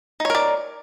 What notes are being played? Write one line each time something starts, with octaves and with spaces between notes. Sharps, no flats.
D#4 A#4 C#5 D5